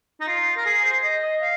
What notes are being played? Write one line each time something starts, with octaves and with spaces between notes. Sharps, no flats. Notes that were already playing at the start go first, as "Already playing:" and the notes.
D#4
F4
A#4
G#4
C5
D#5
D#5
F5